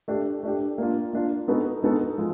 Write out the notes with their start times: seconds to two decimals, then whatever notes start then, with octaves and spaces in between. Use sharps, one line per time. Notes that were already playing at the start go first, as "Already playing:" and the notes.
0.08 A3 D4 G4
0.43 A3 D4 G4
0.78 A#3 D4 F4
1.13 A#3 D4 F4
1.48 G#3 B3 D#4 F#4 A4
1.83 G#3 B3 D#4 F#4 A4
2.18 F3 G#3